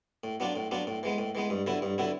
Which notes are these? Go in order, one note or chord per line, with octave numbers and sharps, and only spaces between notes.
A2
F#3 B3 D4 F4
A2
F#3 B3 D4 F4
A2
E3 G#3 B3
A2
E3 G#3 B3
G2
D3 F#3 B3 E4
G2
D3 F#3 B3 E4